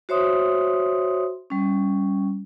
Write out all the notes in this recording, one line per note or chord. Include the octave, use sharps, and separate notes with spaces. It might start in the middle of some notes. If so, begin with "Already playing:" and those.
F#4 C5 C#5 E5 C6 D#6
G3 C#4